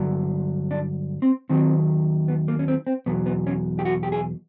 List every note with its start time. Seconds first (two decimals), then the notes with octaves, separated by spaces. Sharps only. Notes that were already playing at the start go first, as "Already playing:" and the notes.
Already playing: G2 D3 F#3
0.71 D4
1.22 C4
1.49 D#2 D#3 F#3 C4
2.28 B3
2.48 A#3
2.59 C#4
2.68 C4
2.87 C4
3.06 E2 B2 F#3 B3
3.26 B3
3.47 C#4
3.79 G4
3.85 F#4
4.03 G4
4.12 G#4